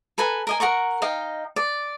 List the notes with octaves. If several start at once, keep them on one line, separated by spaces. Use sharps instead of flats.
A4 B4 G#5 A#5
A#4 D#5 G#5
A#4 F#5 A#5 C#6
D#4 D#5 F5 G5
D5